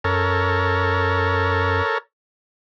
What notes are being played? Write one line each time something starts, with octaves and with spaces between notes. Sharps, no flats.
F#2 A4 A#4 C#5